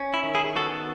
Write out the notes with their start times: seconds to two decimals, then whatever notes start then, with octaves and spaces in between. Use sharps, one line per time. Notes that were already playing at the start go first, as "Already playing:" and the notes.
Already playing: C#4
0.14 E4
0.24 D#3
0.35 E4 G#4
0.55 B3 F#4 A4